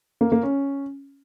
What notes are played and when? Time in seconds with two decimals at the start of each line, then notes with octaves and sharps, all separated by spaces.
0.21 A#3
0.32 A#3
0.43 C#4